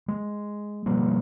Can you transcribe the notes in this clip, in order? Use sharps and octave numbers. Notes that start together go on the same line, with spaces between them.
G#3
B2 F3 G3 A#3